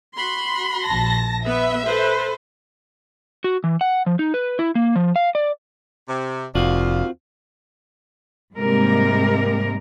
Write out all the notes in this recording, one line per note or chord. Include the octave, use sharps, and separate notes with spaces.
F#4 B5 C6
A#1 A5 A#6
B3 B4 E5
A4 B4 C5
F#4
E3
F#5
F3
D#4
B4
E4
A#3
F3
F5
D5
C3
F1 D#2 C4 D4 F4 F#4 F5
G#2 C3 G3 G#3 A#3 A#4